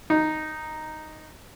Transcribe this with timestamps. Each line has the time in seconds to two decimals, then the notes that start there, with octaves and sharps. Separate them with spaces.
0.10 D#4